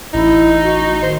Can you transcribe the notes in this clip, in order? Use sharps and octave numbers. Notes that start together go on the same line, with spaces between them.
A1 D#4 E4
F#4
D#3 C5